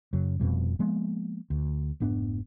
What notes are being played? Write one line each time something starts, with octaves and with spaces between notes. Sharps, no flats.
F#2 C#3 F#3
F1 F2 B2 G3
F3 G#3 A#3 B3
D2
F1 G#2 B3 D4